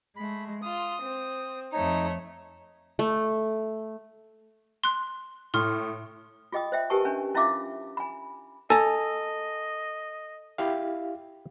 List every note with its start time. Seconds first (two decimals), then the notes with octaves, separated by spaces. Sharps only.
0.16 G#3 A3 B5
0.62 F4 C6 D#6
1.02 C4
1.72 F2 A3 D#4 C#5
2.99 A3
4.84 C6 F#6
5.54 A2 C6 F6
6.52 F4 G#4 D#5 G5 D#6
6.72 C5 E5 G5
6.90 G4 A#4 B4 G#5 A5 C#6
7.05 C#4 D4 G#5
7.35 C#4 E4 F4 E5 F5 D6
7.97 G#5 B5
8.70 A4 D#5 G#5 A#5
10.58 E4 G4 F5